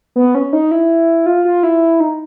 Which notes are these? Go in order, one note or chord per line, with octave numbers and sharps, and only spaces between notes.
B3
C#4
D#4
E4
F4
F4
E4
D#4